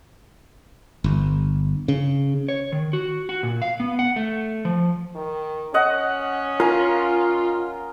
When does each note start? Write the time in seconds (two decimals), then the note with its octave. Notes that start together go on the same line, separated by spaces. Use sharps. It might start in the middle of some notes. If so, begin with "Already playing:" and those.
1.04 G1
1.88 C#3
2.48 C#5
2.72 D#3
2.93 F#4
3.29 F#4
3.43 A#2
3.62 F5
3.80 B3
3.99 F#5
4.16 A3
4.65 F3
5.16 D#3
5.74 C#4 D#5 F#5
6.60 F4 A#4 G#5